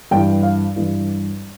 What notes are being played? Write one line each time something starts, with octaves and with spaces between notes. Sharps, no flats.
G2 E3 G5
F5
G2 E3